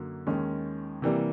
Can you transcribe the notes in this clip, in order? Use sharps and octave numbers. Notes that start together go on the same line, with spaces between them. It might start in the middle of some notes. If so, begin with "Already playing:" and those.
Already playing: F#2 D3 F#3 A#3
D#2 D#3 G#3 C#4
C3 E3 G3 A#3